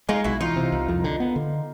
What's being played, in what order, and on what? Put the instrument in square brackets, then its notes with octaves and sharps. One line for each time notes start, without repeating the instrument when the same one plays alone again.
[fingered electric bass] G#3 [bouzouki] D#4 F4
[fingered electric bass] B1 [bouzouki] E4 F#4
[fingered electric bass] E3 [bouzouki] D#4 F4
[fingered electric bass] C3
C2
F2
D3
B3
D3